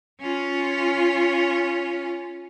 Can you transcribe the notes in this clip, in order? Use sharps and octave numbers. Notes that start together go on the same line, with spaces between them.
C#4 F4